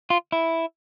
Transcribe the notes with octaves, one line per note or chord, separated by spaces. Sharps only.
F4
E4